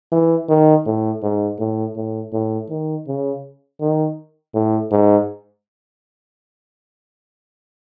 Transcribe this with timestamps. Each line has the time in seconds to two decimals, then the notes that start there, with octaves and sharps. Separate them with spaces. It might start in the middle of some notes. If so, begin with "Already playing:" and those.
0.12 E3
0.49 D#3
0.86 A2
1.23 G#2
1.59 A2
1.96 A2
2.33 A2
2.70 D#3
3.07 C#3
3.81 D#3
4.54 A2
4.91 G#2